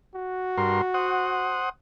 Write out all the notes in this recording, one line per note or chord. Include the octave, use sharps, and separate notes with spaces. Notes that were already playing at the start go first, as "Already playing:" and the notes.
F#4
G2 A#4 C6
C5 F#5 D#6